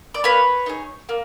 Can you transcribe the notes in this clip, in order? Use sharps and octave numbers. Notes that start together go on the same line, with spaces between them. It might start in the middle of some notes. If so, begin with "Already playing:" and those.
D5
A#3 B4 C#5
D#4 G#4
A#3